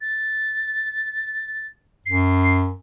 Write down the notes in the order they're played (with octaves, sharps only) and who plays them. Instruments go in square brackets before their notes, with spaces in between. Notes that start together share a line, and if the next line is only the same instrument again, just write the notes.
[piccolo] A6
[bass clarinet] F#2 [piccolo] C7